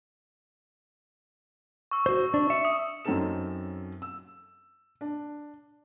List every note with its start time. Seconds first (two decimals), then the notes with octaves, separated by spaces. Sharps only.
1.91 C#6 E6
2.06 F#4 C5
2.34 D4
2.50 E5 C#7
2.65 D#6
3.05 F#2 C4 C#4 D#4 A4 E7
4.02 E6
5.01 D4